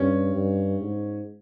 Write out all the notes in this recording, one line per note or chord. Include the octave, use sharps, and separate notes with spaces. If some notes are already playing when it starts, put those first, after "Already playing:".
Already playing: G2 C#4
G2
G#2